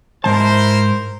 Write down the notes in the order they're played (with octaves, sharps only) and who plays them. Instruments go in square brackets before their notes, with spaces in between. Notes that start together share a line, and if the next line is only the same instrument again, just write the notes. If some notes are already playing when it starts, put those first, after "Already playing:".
[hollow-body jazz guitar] G#2 F#3 A5 [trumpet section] E4 A#4 C5